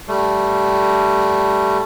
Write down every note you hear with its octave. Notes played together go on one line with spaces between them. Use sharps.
G3 A3